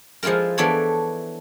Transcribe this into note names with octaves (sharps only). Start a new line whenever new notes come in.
F3 G#3 E4 F4 A#4
E3 B3 D4 E4 A4 C#5